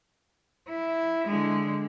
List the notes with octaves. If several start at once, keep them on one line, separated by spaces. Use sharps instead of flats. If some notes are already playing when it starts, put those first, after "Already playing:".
E4
D3 G#3